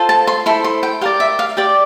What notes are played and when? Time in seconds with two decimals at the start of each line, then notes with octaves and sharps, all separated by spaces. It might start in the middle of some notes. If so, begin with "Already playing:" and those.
Already playing: F4 A4 C5
0.09 A5
0.27 C6
0.46 E4 A4 C5 C6
0.64 C6
0.83 G5
1.01 G4 A#4 D5 F5
1.20 E5
1.39 F5
1.57 G4 D5 G5